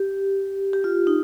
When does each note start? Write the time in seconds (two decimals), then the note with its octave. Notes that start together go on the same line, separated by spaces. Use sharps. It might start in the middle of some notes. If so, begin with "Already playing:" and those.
Already playing: G4
0.73 G4
0.84 F4
1.07 D#4